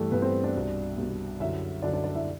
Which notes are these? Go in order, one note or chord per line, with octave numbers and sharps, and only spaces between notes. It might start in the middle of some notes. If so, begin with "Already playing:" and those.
Already playing: G2 E3 G3 A3 G4 A4
G2 E3 B3 B4
C4 C5
D4 D5
C2 B2
C2 B2
F#2 D3 E4 E5
F#2 D3 D4 D5
D4 D5
D4 D5
E4 E5